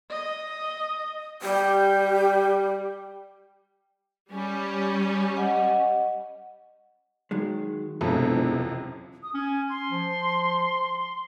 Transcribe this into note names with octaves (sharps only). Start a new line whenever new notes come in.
D#5
G3 G4
G3 C#4
D#5 F#5
D#3 F#3 G#3
E1 C#2 F#2 C3 E3 F3 A4
D#6
C#4 G#5
C6
F3